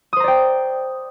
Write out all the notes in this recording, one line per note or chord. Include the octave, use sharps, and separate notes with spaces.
C5 D5 G5 A#5 D#6